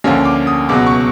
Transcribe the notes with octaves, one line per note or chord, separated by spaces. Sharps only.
D2 D3 F3 A#3 C#4
D6
D#6
C#2 B2 F#3 B3 D6
C#6